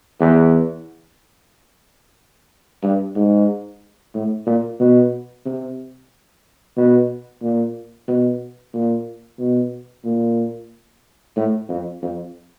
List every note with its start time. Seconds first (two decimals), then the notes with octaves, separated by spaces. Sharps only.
0.20 E2
2.83 G2
3.15 G#2
4.14 A2
4.46 A#2
4.79 B2
5.45 C3
6.77 B2
7.42 A#2
8.08 B2
8.73 A#2
9.39 B2
10.04 A#2
11.36 A2
11.69 F2
12.02 F2